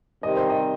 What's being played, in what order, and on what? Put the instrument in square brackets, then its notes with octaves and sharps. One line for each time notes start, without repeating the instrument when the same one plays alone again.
[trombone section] C3 D#3 G3 C4 [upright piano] D#5
[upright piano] C5
D#5